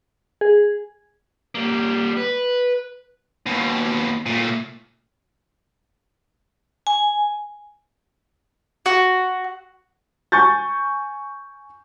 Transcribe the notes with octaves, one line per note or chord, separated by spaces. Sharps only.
G#4
G3 A#3
B4
D#2 B2
A#2 A3
G#5
F#4
G#5 C#6 G6 A6